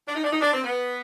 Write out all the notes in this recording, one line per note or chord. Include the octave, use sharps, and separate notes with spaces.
D4
D#4
D4
D#4
D4
C4
B3